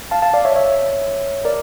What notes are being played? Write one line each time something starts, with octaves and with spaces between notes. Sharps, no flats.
F5 A5
F5 A5
D5 F5
C#5 E5
C#5 E5
A#4 D5